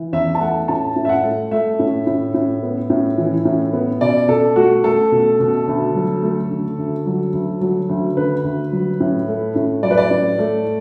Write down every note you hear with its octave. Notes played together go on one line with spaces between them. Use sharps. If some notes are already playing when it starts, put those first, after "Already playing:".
Already playing: E3
E2 E5
A5
A3 F#5
A2 A5
A2
E5
F#5
A3
A3 E5
A2
A2
A2
B3
A2
E3
A2
B3
B2 D5
B2 A4
A3 F#4
A3 A4
B2
B2
D2
F#3
A3
D3
D2
F#3
D2
F#3
D2
D3 B4
D2
F#3
A2
A3
A2
F#3 D5
B4
D5
A2
A3